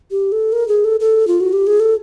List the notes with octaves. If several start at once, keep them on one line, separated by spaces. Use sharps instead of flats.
G4
A4
A#4
G#4
A4
A4
F4
F#4
G4
G#4
A4